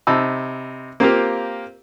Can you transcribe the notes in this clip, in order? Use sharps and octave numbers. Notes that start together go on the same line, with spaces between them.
C3 D#4 A5 B5 E6
A#3 C4 F4 G4 A#4